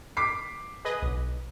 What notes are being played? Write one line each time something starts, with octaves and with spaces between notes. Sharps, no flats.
D6 B6 C7
G#4 B4 D#5
B1